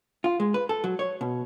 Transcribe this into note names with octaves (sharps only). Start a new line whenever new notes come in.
F4
G#3
B4
A4
F#3
C#5
B2